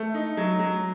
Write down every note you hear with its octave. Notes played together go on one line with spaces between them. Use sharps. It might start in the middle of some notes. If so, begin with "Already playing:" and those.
Already playing: A3
D#4
F#3
F#3